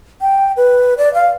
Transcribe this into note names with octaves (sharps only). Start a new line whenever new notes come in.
G5
B4
D5
F5